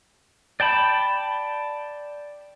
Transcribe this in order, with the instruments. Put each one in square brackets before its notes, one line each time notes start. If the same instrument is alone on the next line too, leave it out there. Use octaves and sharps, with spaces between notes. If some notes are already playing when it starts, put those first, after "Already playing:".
[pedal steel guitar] D5 G5 A5 B5